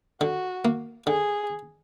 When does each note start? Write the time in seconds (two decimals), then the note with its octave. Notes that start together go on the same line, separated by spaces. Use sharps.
0.21 D3 F#4
0.65 A#3
1.07 D3 G#4